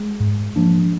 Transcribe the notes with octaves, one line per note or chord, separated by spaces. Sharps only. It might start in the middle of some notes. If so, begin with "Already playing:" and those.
Already playing: G#3
G#2
F3 A#3 D4